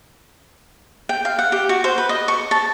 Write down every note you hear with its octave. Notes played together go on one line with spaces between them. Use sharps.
G5
F5
F#5
G4
F#4
C5
B4
D#5
C#6
A5